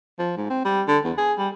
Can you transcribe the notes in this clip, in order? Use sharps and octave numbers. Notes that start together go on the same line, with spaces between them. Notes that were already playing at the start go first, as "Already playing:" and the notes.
F3
G#2
C4
G3
D3
E2
G#4
G3